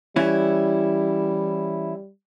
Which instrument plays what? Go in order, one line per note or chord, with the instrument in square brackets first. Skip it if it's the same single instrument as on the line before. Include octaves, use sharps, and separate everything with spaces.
[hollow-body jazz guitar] E3 C#4 E4 [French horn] G3